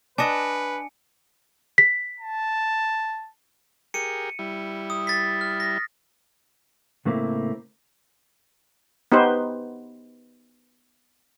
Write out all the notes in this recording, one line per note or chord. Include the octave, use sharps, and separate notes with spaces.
D4 B4 D#5 G#5 C#7
B6
A5
G4 G#4 A#4 C#7 D#7
G3 E4
D#6
A6 B6
F6
A#6
A2 C#3 A3 A#3 C4 E4
B3 D#4 G4 B4 C5